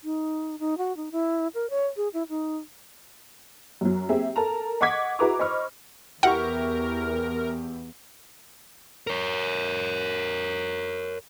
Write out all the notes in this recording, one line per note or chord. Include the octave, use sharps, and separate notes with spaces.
D#4
D#4
F#4
D#4
E4
A#4
C#5
G#4
E4
D#4
F#2 F#3
A#3 C4 G4 G#4 E5
A4 A#4 A5 A#5
D#5 F#5 C#6 D6 G#6 B6
E4 F#4 G#4 B4 A#5 D6
C5 D#5 B5 C#6 F6
E2 E4 G4 A#4 F#5 C#6
A#4 C#5